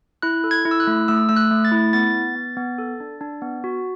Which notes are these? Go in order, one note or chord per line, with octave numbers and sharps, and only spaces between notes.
E4 F#6
A4
G#6
E4
E6
F#6
A3
A3 E6
A3 E6
F#6
A3
A6
E4
B3 A6
B3
B3
B3
A4
D4
D4
B3
F#4